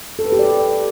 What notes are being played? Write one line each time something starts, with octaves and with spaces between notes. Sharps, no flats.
A4
B4
G4
D5